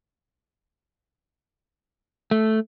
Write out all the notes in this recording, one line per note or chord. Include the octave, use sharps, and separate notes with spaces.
A3